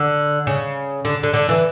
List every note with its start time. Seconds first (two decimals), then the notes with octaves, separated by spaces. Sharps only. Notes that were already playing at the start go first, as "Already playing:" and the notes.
Already playing: D3
0.47 C#3
1.05 D3
1.23 D3
1.34 D3
1.49 E3